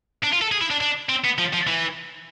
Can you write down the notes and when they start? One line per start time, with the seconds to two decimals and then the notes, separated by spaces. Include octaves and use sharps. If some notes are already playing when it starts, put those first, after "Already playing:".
0.23 D4
0.32 F4
0.41 A4
0.52 G#4
0.61 E4
0.70 D4
0.81 D4
1.09 C4
1.24 B3
1.38 F3
1.53 F3
1.67 E3